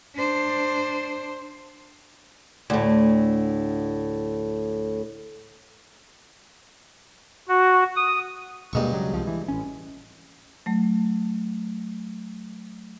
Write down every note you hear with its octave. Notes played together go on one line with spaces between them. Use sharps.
D4 C5
D2 A2
F#4
D#6
D#1 G2 B2 G#3 A#3 C#6
C#3 F#3
C2 F3
E3
A1 C#4
F#3 A3